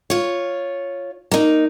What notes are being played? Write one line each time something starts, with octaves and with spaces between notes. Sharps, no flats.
F4 C#5
A#3 D#4